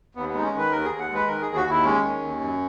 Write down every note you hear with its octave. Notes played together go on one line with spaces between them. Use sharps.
D#2 B3
B3
G#3 D#4
C#4
D#3 B4
D#2 A#4
G#4
D#2
F#5
G#3
B4
D#3 A#4
D#2 G#4
F#4
D#2 E4
G#3 C#4
D#3
D#2
F#2